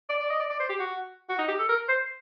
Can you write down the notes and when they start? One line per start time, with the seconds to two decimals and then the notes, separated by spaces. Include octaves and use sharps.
0.09 D5
0.20 D5
0.30 D#5
0.40 D5
0.50 D5
0.60 C5
0.69 G4
0.80 F#4
1.29 F#4
1.39 D#4
1.48 G4
1.59 A4
1.69 A#4
1.89 C5